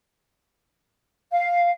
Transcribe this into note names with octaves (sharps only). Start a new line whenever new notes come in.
F5